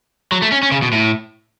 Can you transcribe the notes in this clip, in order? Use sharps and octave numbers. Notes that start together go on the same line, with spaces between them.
F#3
A3
C#4
C#4
C#3
B2
A2